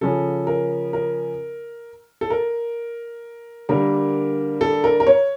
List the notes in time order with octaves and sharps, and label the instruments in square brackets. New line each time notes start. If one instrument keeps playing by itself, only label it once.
[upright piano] C#3 F3 C#4 A4
A#4
A#4
A4
A#4
D3 G3 A#3 A#4
A4
A#4
A#4
C#5